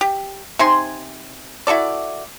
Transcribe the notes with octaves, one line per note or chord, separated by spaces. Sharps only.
G4
C3 D#4 G#5 C6
E4 F#4 A4 D5